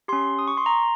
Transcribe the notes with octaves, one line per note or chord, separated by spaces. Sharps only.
C#4 G4 C6
D#6
C#6
C6
A#5